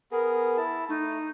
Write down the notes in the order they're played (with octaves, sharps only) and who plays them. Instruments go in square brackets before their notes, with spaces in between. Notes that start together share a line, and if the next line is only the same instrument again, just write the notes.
[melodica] B3 G#4 [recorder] A#4
[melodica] E4 A5
[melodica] A3 [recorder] D#4